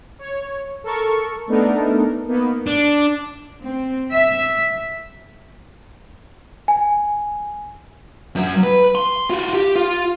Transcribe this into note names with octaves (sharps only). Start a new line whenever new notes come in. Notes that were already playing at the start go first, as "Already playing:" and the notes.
C#5
A4 A#4 C#6
A3 B3 D4 D#4 A4 A#4
A#3 B3 D#4
D4
C4
E5
G#5
F#2 F#3
B4
C6
F4 F#4
G4
F4